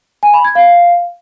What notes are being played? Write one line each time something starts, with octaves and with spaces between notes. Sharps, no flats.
G#5
B5
G#6
F5